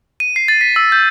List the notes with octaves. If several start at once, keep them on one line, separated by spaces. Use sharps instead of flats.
D#7
C7
A6
B6
E6
G6